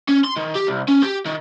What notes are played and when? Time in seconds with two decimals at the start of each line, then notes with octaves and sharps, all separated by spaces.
0.09 C#4
0.25 C6
0.37 D#3
0.55 G4
0.67 C2
0.89 C#4
1.03 G4
1.26 D#3